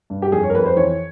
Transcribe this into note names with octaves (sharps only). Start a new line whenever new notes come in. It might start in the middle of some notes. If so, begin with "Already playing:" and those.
G2
G4
F2 G#4
C#5
A#4
F2 B4
C5
E3 C#5